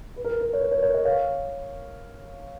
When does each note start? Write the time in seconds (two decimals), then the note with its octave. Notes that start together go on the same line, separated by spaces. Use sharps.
0.16 B4
0.24 A#4
0.41 A#4
0.53 C#5
0.60 B4
0.71 A#4 C#5
0.83 A#4 C#5
0.93 B4 D#5
1.05 C#5 F5